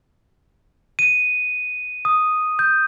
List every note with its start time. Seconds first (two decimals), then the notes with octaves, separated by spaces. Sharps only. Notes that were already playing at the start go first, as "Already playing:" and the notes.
0.99 D#7
2.05 D#6
2.59 G6